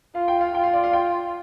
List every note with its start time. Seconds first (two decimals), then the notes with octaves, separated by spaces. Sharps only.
0.15 F4 F5
0.28 G5
0.41 F5
0.54 F4 G5
0.64 F5
0.73 D5
0.84 F5
0.93 G5